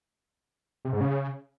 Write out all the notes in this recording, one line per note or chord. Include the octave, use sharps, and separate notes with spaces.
C3
G#2
C#3